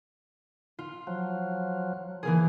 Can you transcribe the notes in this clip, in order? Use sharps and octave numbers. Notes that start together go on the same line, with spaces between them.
F4
F3 F#3
E3 A#3 G#4